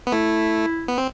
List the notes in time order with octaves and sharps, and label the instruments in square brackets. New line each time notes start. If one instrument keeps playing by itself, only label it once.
[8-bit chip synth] B3
[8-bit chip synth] A3 [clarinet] E4
[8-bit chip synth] B3
C4